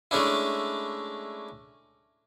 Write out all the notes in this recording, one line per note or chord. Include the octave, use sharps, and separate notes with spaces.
G#3 A3 C#4 D4 E4